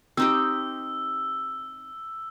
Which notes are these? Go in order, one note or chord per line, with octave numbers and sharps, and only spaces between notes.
C4 D#4 G4 E6